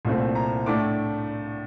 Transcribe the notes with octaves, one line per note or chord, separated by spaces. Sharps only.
C2 A#2 A3 C4
A#5
A2 A3 D4 D6